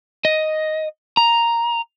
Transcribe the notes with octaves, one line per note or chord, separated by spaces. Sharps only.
D#5
A#5